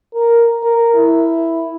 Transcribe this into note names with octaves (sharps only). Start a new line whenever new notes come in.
A#4
A#4
E4